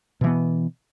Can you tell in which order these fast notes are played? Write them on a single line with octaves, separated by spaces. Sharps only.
B2 E3 B3